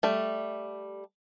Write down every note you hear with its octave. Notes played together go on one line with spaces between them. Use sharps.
G3 A3